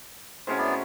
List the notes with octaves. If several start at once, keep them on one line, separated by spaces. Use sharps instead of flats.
A2 F#3 G#3 C4 C#4
B3 E4 D5